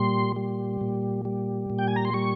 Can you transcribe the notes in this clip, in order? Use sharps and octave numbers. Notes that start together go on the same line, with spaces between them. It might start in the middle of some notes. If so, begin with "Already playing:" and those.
Already playing: A#2 G3 C6
G3
A#2
G3
A#2
G5
G#5
A#5
C6
G3 C#6